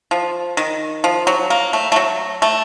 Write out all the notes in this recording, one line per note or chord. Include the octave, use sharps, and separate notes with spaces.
F3
D#3
F3
F#3
A#3
A3
A3
F#3
A3